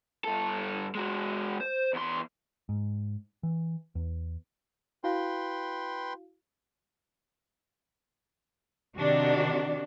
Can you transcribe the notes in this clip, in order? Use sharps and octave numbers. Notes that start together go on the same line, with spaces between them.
G2 A4
G#3 F#4
C5
E2 C6
G#2
E3
E2
E4 F#4 B4 F5 G5 C6
C3 D#3 D4 F#4 G4